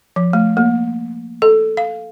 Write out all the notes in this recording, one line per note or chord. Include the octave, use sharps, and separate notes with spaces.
F3
A3
A#3
A4
F5